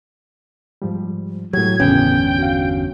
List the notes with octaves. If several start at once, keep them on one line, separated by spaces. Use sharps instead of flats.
G#2 F3 G3
A2 F#3 G4 G#6
G1 E2 A2 C#3 B3 C#4 G5
F#4 F5